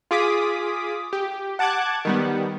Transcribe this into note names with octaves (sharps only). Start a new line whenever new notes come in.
F4 G#4 D6 D#6 B6
G4
F#5 A5 D6 F#6 G#6
D#3 G3 B3